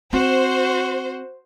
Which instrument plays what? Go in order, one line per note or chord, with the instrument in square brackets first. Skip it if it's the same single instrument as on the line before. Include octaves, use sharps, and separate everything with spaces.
[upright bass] C4 [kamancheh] F#4 [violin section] C5